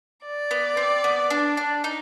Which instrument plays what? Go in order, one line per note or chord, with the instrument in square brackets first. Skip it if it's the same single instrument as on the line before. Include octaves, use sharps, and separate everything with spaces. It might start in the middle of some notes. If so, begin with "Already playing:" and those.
[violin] D5
[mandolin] B3
C4
B3
D4
D4
D#4